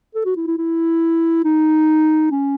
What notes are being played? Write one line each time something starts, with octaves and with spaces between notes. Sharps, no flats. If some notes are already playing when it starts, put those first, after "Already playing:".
A4
F#4
E4
E4
E4
D#4
C#4